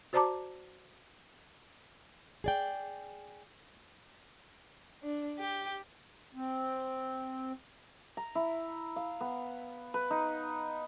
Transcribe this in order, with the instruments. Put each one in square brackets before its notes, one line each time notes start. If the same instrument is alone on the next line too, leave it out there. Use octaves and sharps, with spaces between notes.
[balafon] F#4 C5 D5 A5 A#5 D6
[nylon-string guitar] G#4 D5 G5
[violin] D4
G4
[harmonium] C4
[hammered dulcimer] A#5
E4
F5
B3
B4
D#4